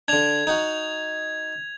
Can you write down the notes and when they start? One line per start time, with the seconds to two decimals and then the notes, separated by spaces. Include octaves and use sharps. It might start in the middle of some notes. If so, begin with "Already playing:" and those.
0.08 D3 D4 G#6 F7
0.47 D#4 F#4